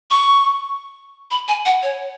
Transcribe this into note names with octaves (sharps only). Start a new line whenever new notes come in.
C#6
B5
G#5
F#5
C#5